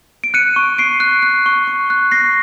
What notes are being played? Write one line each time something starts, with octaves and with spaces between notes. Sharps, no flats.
D7
F#6 C#7 D#7
C#6
C#6 C7 D7
F#6
F#6
C#6
C#6
F#6
C#6 A#6 C7